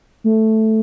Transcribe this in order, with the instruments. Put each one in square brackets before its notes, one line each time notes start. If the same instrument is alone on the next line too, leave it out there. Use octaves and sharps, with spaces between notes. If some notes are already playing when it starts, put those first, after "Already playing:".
[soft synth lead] A3